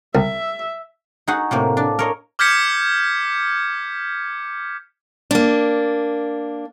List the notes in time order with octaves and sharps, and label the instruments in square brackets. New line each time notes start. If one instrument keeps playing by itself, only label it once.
[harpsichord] C2 [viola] E5
[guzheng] D#4 F#4 G#4 F#5
A2 C3 A#3
D4
A#4 C#5 D#5
[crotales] D6 F6 G6 G#6 B6 C#7
[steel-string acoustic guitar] A#3 D4